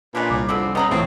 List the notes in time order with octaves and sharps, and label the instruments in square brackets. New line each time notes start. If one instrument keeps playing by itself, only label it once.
[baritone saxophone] A#2 [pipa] G#3 C#4 D4 [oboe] B4
[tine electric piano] C2 [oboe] D6
[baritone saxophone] F2 [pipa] D3 G#3 B5 [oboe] C4
[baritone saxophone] C#3 [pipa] B3 A#5 B5 [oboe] D#5
[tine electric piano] A2 E3 C#5 [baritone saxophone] C4 [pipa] F4 [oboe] G5